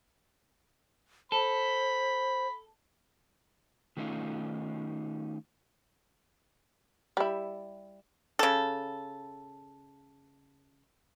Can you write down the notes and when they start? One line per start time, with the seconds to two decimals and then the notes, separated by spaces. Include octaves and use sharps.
1.32 A4 C5 B5
3.97 D#3 A3 C#4 D#4 F4
7.17 G3 E4
8.39 C#3 A4